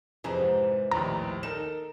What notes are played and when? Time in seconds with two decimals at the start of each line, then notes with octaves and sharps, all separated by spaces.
0.24 F2 C3 E3 G#4 A#5
0.40 G#2
0.92 A#1 D#2 A2 A#5
1.43 D#4 A4 A#4 E7